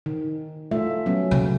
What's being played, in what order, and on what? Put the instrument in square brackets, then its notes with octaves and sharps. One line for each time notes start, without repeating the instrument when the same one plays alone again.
[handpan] D#3
A3 F4 E5
F#3 B3 C#4
[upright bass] C#3